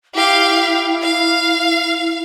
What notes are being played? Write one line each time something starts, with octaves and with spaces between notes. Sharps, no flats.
E4 G4 F5
F5